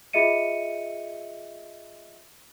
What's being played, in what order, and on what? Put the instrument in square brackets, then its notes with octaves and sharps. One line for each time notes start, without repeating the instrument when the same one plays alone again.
[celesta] F4 G#4 D#5 E5 C#7 D#7